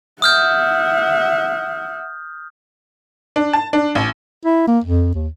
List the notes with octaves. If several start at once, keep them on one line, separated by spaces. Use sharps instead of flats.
E5 F#5 D#6 F6 G6
D4
A5
D4
A1
E4
A#3
F2
D#2